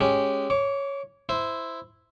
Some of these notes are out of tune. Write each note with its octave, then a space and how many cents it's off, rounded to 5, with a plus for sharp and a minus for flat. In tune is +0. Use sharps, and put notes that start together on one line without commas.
G#3 +0 C#4 +0 G4 -5
C#5 +0 D6 -30
E4 +0 C5 -10